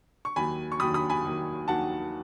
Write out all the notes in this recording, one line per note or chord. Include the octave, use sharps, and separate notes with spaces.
C#6
D#2 D#3 F#3 G#5 B5
C#6
D#2 D#3 F#3 B5 D#6
B5 D#6
G#5 B5
D#2 D#3 F#3
D#2 D#3 F#3 F#5 A5